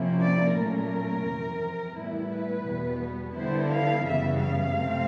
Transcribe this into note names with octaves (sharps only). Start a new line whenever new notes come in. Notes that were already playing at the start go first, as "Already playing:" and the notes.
Already playing: C3 F3 A#3 C#4 E4
D5
A#2 F#3 A3 C#4 A#4
F2 C3 E3
A2 E3 G3 B3 E4 B4
E2 B2 G3 B3
D3 G3 B3 E4 C5
F5
F#2 C#3 E3 G3 B3 E5
F5
C3 E3 A3 C4